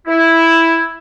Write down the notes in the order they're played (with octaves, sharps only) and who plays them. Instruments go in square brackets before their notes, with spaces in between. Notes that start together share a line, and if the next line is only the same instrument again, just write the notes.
[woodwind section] E4